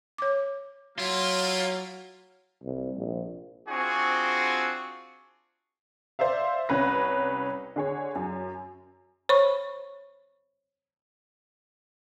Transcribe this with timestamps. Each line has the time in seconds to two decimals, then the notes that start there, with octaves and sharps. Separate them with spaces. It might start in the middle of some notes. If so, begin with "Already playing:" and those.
0.18 C#5 D6
0.98 F#3 A#3 E4 F4
2.63 C2
2.96 A#1
3.68 C4 D4 F4 F#4 G#4 C#6
6.19 C5 D5 E5 F5
6.69 C2 C#4 B4 A#6
7.76 D3 G#4 C#5
8.15 F#2
9.29 C5 C#5 B5 C#6